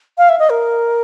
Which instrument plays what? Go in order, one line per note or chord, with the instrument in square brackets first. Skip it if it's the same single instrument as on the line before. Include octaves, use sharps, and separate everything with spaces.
[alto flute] F5
E5
D#5
A#4